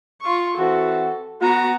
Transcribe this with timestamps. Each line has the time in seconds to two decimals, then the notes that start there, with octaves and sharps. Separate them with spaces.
0.21 F4 C#6
0.57 E3 C4 F#4 A4
1.41 B3 F#4 A#5